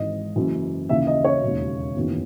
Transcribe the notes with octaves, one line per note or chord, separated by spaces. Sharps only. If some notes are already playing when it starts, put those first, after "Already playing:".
Already playing: G#1 G#2 E3 D#5
F#1 F#2 E3
D#2 C#3 E3 E5
D#5
C#5
E1 D#2 C#3 F#3
F#1 E2 D#3 F#3